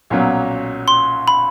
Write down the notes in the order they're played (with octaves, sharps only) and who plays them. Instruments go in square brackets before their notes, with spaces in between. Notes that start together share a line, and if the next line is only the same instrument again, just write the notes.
[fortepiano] B1 A#2 F#3 A#3 C#4
[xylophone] C6
B5